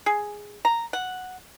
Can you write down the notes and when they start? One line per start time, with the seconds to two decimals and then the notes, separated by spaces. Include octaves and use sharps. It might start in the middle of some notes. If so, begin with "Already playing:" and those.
0.06 G#4
0.65 A#5
0.93 F#5